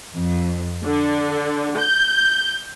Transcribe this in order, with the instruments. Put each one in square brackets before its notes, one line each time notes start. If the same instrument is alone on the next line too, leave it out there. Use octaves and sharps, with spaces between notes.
[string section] F2
D3
G6